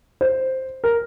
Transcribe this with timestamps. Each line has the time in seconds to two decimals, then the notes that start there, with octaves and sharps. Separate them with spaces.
0.21 C5
0.84 A#4